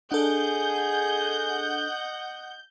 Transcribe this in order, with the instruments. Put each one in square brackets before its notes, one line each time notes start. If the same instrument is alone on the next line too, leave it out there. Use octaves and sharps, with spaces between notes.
[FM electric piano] D4 A4 [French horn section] G#4 [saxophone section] D#5 F#5 [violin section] G6